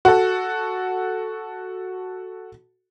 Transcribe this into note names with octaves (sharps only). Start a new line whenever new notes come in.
F#4 A4